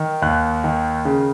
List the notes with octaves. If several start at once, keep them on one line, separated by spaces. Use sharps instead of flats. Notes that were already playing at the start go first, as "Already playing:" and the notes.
Already playing: D#3
D#2 F#6
D#3
C#3